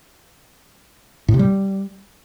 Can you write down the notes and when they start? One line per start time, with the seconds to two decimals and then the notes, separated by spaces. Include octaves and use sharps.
1.28 A2
1.34 C3
1.39 G3